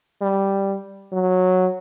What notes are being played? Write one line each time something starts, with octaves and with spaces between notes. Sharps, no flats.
G3
F#3